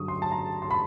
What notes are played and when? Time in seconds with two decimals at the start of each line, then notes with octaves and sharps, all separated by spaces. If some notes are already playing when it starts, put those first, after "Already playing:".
Already playing: G2 D3 F#3 C#6 D#6
0.08 C6
0.22 A5
0.32 A#5
0.62 C6
0.71 B5